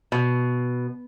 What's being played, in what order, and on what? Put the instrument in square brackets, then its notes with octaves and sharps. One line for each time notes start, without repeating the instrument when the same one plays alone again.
[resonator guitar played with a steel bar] B2